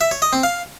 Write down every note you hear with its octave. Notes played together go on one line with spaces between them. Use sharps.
E5
C#5
D#5
C4
F5